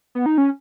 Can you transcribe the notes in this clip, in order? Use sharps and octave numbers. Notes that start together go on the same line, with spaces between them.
B3
D#4
C#4